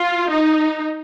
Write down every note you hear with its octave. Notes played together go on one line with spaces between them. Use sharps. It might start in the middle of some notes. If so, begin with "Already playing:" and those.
Already playing: F4
D#4